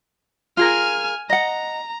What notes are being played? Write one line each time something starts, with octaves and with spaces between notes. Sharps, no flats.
F4 G#4 A#4 G#5 F6
D#5 F#5 A#5